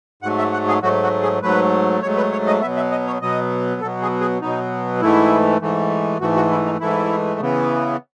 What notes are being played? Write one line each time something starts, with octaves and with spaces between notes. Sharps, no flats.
G#2 F#3 A3 F#5
E5
F#5
G#4
G#2 F#3 A3 F#4
F#4
G#4
G#2 F#3 A3 B4
G#2 F#3 A3 C#5
B4
C#5
D#5
B2 F#3 B3 E5
E5
D#5
C#5
B2 F#3 B3 D#5
B2 F#3 B3 A4
G#4
G#4
B2 F#3 B3 D#4
G#2 E3 A3 E4
G#2 E3 A3
G#2 E3 A3 F#4
F#4
E4
D#4
G#2 E3 A3 E4
C#3 E3 B3